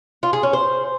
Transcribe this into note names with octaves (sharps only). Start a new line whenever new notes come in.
F4
G#4
C#4
C5